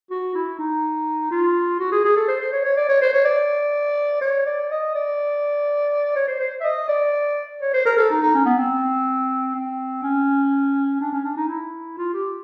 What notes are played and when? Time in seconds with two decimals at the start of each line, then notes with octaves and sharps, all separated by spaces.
0.11 F#4
0.35 E4
0.59 D#4
1.31 F4
1.79 F#4
1.92 G#4
2.04 G#4
2.16 A4
2.28 C5
2.40 C5
2.52 C#5
2.64 C#5
2.76 D5
2.89 C#5
3.01 C5
3.13 C#5
3.25 D5
4.21 C#5
4.46 D5
4.71 D#5
4.95 D5
6.16 C#5
6.27 C5
6.39 C5
6.61 E5
6.64 D#5
6.88 D5
7.62 C#5
7.73 C5
7.85 A#4
7.97 A4
8.10 D#4
8.21 D#4
8.34 C#4
8.45 B3
8.58 C4
9.55 C4
10.03 C#4
11.01 D4
11.12 C#4
11.25 D4
11.37 D#4
11.48 E4
11.98 F4
12.13 G4